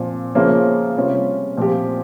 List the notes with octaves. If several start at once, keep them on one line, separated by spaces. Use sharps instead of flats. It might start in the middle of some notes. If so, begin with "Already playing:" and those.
Already playing: A#2 F3 C4
C#3 F3 A#3 C#4 F4
C3 G3 C#4 F4
A#2 F3 C4 G4